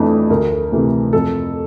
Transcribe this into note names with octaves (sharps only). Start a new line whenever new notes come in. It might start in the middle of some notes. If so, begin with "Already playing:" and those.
Already playing: F2 E3 A3 D4
D2 A#4
C3 E3 A3
F2 A4